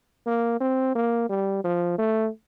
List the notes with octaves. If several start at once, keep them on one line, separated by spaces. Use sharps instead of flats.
A#3
C4
A#3
G3
F3
A3